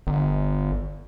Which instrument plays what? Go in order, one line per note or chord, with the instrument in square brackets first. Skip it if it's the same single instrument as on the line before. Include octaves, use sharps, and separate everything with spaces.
[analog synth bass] G1